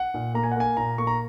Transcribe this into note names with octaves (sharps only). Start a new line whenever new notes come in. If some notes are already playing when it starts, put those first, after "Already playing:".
Already playing: F#5
A#2
A#3 A#5
G#5
F#5
A#3 G#5
A#2 A#5
A#3 C#6
A#5